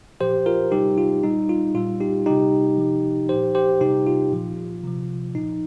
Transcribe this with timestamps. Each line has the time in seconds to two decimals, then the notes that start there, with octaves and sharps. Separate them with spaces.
0.20 A#2 F3 G4 C5
0.46 F4 A#4
0.72 C3 G3 D#4 G4
0.98 F4
1.23 A#2 G3 D#4
1.49 F4
1.75 A#2 G3 F4
2.01 D#4 G4
2.26 C3 G3 D#4 G4
2.78 C3 F3
3.29 A#2 F3 G4 C5
3.55 G4 C5
3.81 C3 G3 D#4 G4
4.07 F4
4.32 A#2 F3
4.84 C3 F3
5.35 A#2 F3 D#4